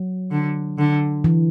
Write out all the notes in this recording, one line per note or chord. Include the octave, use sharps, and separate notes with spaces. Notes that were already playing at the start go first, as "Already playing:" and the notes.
Already playing: F#3
D3
D3
E3